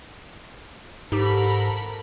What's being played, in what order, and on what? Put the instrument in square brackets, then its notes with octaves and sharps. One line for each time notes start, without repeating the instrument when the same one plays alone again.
[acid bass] G#2 [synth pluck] D#4 G4 [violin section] A4 A#4 B5